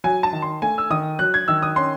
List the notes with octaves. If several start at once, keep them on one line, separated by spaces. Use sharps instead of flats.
F#3 G#5
A5
D#3
C6
A3 G#5
E6
D#3 D#6
F#3 F#6
G#6
D#3 E6
D#6
C#4 C6